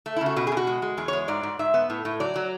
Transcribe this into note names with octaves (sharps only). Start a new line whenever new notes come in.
A3
E4
C#3
F#4
B2 F#4
G#4
B2
F#4
G#3
G#3
E2 G#4
C#5
G#3
G#2 D5
G#2
G#2 E5
B3
A2
A2
F#3 D5
F#3